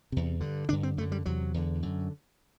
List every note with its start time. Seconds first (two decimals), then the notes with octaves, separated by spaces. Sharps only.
0.12 E2 C3
0.40 G2 D3
0.69 G2 D3 D4
0.83 C4
0.97 F#2 D3 A3
1.12 G3
1.26 E2 C3 F#3
1.54 E2 D3
1.83 F#2 D3